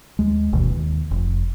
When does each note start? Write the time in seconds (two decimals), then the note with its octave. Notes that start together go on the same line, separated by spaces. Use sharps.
0.19 D#2 G#3
0.53 F#1 D2 B2 E3
0.71 D#2
1.11 F1